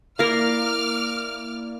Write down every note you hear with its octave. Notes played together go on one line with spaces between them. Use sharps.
A#3 E4 A#4 D5 F5 D6 F6